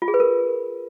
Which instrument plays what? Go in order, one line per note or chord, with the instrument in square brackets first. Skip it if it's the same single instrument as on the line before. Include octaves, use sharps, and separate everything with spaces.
[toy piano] F4
G#4
B4
A#4